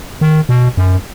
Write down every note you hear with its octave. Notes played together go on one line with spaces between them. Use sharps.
D#3
B2
F#2